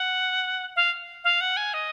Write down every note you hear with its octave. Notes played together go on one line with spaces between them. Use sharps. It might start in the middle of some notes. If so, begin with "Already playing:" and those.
Already playing: F#5
F5
F5
F#5
G#5
D#5